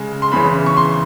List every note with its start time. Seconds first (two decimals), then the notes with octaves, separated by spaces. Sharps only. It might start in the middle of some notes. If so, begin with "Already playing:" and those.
Already playing: C#3 G#3
0.22 C6
0.32 E2 C#3 E3 B5
0.66 C#6
0.77 C6